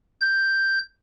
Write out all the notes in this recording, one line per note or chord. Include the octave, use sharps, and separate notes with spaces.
G6